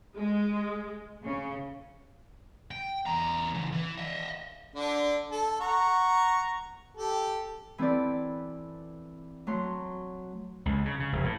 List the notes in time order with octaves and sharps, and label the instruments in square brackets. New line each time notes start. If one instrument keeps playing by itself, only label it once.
[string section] G#3
C#3
[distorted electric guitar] G5
E2 A#5
C#3 E3
E3
D#5 E5
[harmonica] D3 D4
A4
F#5 A#5 C#6
G4 A4
[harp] E3 C4 E4 A4 B4 D5
F#3 A3 C6
[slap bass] C#2
C#3
C#3
F1
A2